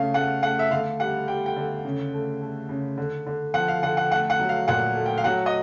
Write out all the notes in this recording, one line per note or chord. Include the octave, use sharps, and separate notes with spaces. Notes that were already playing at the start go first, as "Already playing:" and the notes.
Already playing: C#3 A3 F5
A3 F#5
A3 F#5
E5
D3 F5
G3 F#5
G3 G5
G5
D3
C#3
A3
A3
C#3
D3
D3
F3 F#5
F5
D3 F#5
F#5
A3 F#5
F#5
F#3
F5
A#2 F#5
A3
G5
F5
F#3 F#5
D#5